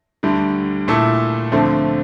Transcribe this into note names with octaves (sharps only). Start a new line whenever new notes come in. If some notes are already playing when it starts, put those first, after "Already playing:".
D2 D3 G3
A#2 A3 E4 A4
D2 D3 F3 A3 C4